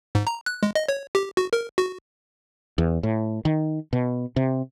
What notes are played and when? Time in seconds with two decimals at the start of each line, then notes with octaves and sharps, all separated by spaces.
0.15 G#2
0.27 A#5
0.46 F#6
0.63 G#3
0.75 D#5
0.88 C#5
1.15 G4
1.37 F#4
1.53 A#4
1.78 F#4
2.78 E2
3.03 A2
3.45 D#3
3.93 B2
4.36 C3